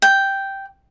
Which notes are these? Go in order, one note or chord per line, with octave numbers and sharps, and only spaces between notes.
G5